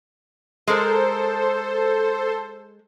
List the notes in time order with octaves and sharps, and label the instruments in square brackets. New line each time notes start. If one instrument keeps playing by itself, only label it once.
[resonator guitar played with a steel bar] G#3 A#4 [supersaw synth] A4 C5